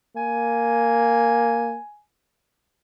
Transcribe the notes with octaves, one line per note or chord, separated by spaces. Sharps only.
A#3 G#5